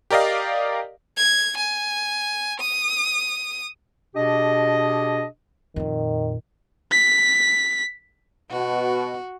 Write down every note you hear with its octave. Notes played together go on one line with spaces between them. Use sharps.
G4 A#4 D5 D#5 F5
G#6
G#5
D#6
B2 D4 G4 G#4 D#5
F2 A#2 D#3
B6
B2 F#4